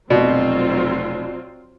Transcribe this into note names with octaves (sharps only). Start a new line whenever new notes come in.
F1 B2 F#3 C4 F4 D5